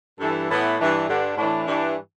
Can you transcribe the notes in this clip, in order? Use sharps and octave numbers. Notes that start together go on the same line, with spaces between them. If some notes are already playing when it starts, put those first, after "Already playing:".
G2 E3 A4
A2 E3 B3
G2 E3 D4
G2 D3 D4
A2 E3 D4
G2 E3 D4